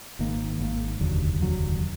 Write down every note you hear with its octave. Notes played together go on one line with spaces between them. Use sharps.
G#1 G#2 D#3 A#3
G#1 G#2 D#3 A#3
F1 D#2 D3 F#3
F1 D#2 D3 F#3